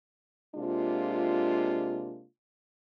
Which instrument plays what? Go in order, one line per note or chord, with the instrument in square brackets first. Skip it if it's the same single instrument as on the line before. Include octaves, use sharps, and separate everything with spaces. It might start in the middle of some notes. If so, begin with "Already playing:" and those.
[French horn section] C3 G#3 A#3 D4 F4